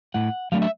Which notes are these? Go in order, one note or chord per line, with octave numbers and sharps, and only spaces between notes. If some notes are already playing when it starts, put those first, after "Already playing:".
A2 F#5
F#3 A3 D4 F5
E5